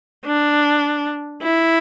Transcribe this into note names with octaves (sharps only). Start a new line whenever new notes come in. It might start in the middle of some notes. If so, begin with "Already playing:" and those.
D4
E4